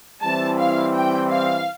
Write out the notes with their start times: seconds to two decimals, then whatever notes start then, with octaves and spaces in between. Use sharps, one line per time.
0.22 E3 G3 C4 E4 A5
0.59 F5
0.94 G5
1.31 F5